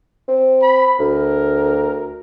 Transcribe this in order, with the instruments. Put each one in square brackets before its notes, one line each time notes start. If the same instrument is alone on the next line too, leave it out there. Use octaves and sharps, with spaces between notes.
[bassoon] C4
[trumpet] B5
[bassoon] D2 [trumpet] A#4